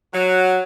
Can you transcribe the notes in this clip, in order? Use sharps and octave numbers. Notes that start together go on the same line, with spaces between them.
F#3